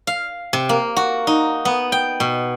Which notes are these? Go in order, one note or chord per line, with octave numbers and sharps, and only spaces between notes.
F5
C3
A#3
F#4
D#4
B3
G5
B2